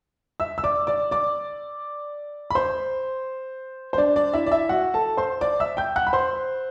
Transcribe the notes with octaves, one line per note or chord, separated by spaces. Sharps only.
E5 E6
E6
D5 D6
D5 D6
D5 D6
B5
C5 C6
C5
D4 D5
D4 D5
E4 E5
D5
E4 E5
F#4 F#5
A4 A5
C5 C6
D5 D6
E5 E6
G5 G6
F#5 F#6
B5
C5 C6